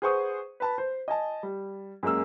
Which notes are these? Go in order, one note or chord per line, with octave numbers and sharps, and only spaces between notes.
G#4 B4 C5 F#5 C#6 D#6
B4 A5 B5
C5
D#5 G#5 A5
G3
F#2 G#3 A#3 E6